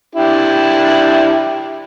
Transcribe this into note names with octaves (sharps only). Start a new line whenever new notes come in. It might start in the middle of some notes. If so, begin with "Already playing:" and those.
D4 E4 G4